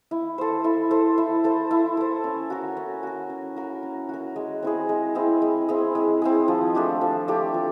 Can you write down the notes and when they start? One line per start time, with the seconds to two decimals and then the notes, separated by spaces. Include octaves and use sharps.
0.11 E4
0.38 A4 C5
0.64 E4
0.91 A4 C5
1.18 E4
1.44 A4 C5
1.71 E4
1.97 A4 C5
2.24 C#4
2.50 F#4 A#4
2.77 C#4
3.03 F#4 A#4
3.30 C#4
3.57 F#4 A#4
3.83 C#4
4.09 F#4 A#4
4.36 G#3
4.62 C4 E4 G#4
4.89 G#3
5.15 C4 E4 G#4
5.42 G#3
5.68 C4 E4 G#4
5.95 G#3
6.22 C4 E4 G#4
6.48 F3
6.75 A3 D4 G4
7.01 F3
7.28 A3 D4 G4
7.54 F3